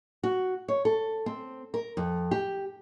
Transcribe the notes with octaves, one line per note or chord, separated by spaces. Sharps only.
F#4
C#5
A4
C4
A#4
F2
G4